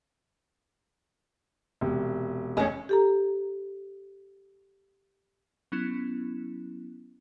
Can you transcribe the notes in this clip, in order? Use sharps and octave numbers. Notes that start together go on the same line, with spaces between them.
E1 C3
F1 G#3 C#4 G#6
G4 A4 A#5
F#3 B3 C#4 E4